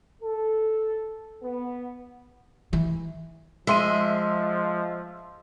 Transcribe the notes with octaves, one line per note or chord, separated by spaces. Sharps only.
A4
B3
E3
F3 G#3 E5 C6 D#7